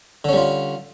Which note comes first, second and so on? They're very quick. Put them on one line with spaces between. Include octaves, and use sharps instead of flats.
D3 C#4 G3 F4